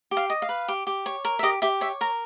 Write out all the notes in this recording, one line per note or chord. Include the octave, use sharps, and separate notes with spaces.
G4
F5
D#5
F5
B4
G4
G4
C#5
A#4
E5
G4 D#5
G4 E5
C#5 E5
A#4 A#5